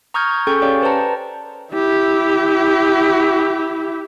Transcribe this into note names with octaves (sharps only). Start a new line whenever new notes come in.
A#5 C#6 D#6 F6 G6 G#6
C#4 G#4 A4 G5 C#6 G6
C#4 G4 C#5 D5 F5 G5
B4 C5 D5 G5 A5 A#5
E4 G4